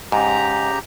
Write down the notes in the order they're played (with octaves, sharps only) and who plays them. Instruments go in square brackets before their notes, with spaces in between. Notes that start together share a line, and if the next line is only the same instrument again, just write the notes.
[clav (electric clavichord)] G#2 [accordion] C#3 G4 A#5